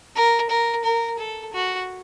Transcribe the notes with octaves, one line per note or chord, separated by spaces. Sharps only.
A#4
A#4
A#4
A4
F#4